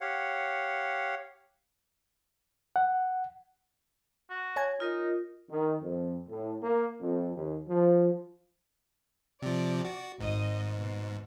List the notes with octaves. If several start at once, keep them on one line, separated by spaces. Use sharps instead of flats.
G4 C#5 F5 F#5
F#5
F#4
C#5 G#5 G#6
D#4 F4 A#4 D#5
D#3
F2
A2
A#3
F2
D#2
F3
C3 F3 D5
F#4
G#1 G#2 D#5
B2